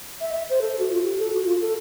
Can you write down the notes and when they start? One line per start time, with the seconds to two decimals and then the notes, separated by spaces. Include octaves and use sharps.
0.21 E5
0.32 E5
0.49 C5
0.61 A4
0.79 F#4
0.91 F4
1.04 G4
1.19 A4
1.32 F#4
1.45 F4
1.61 A4